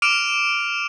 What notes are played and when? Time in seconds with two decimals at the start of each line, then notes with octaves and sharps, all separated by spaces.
0.02 D6 F6 D7 D#7 F7